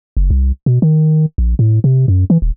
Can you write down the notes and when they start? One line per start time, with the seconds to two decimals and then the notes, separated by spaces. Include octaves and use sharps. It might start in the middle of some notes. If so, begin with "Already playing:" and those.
0.17 F#1
0.30 C2
0.66 B2
0.82 D#3
1.38 A#1
1.59 A2
1.84 C3
2.08 F#2
2.30 E3
2.42 D#1